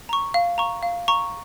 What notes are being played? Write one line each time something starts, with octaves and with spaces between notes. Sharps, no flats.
A#5 C#6
F5
A#5 C#6
F5
A#5 C#6